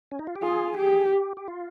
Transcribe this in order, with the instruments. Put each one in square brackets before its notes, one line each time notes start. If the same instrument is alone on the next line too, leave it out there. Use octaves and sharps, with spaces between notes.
[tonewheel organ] C#4
D#4
F4
G4
[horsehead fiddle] F4 [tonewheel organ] G#4
[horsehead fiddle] G4
[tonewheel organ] G4
G4
F4